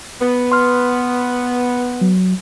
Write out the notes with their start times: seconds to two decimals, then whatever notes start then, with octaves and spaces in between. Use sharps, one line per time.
0.21 B3
0.52 C6 F6
2.01 F#3